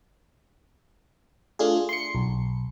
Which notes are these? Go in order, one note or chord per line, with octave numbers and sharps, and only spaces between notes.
A3 D4 F4 G#4
C6 C#7
B1